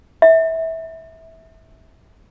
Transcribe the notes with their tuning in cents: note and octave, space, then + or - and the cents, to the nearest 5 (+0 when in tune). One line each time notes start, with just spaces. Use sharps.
E5 -20